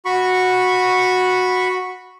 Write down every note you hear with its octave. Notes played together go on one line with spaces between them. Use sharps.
F#4 B5 C#6